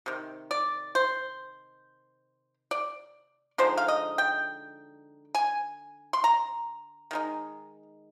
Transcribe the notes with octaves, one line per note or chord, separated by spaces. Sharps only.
C3 D#3
D5
C5
D5
D3 F3 G#3 D#4 C5
F5
D#5
G5
G#5
C6
A#5
D#3 G#3 D#4